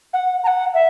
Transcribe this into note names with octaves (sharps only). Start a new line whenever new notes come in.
F#5
A#5
F#5
E5